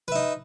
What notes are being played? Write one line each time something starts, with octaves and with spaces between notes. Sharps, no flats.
D#4 B4 E5